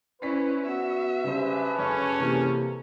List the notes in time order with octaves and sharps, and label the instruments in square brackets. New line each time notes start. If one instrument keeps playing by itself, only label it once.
[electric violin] C#4 E4 [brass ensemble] B4 [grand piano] C5 D5 B6
[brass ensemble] B3 F#4 [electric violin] E5
[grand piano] C#3 G3 C5 [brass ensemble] D4 G#4 B4
[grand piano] F#2 C#3 [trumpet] C#4 [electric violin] A4 C#5
[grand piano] C3 E3 A#3